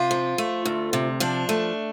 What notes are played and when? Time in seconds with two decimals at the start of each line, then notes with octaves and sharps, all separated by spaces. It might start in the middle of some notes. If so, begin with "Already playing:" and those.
Already playing: C3 F4
0.11 F3
0.38 A3
0.65 D2
0.93 C3
1.20 F3 D4
1.49 A3